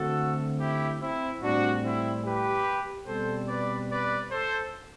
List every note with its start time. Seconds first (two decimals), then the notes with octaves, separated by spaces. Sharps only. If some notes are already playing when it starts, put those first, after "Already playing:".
Already playing: D3 A3 C4 F#4 A4
0.59 E4 G4
1.01 C4 E4
1.42 A2 G3 C4 D4 F#4
1.84 C4 E4
2.24 G4 B4
3.07 B2 G3 C4 A4 C5
3.48 B4 D5
3.90 B4 D5
4.31 A4 C5